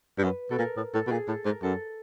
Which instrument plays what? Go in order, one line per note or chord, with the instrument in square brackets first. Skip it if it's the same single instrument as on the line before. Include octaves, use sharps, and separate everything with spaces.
[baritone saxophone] G2
[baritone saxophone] F#2 [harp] B4
[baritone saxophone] B2 [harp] A4
[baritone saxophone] A#2 [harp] A#4
[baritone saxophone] A2
[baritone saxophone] A2 [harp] A4
[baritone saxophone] B2
[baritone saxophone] A#2 [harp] G#4
[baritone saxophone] A2 [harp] A4
[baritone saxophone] G#2 [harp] A#4
[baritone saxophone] F#2 [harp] A4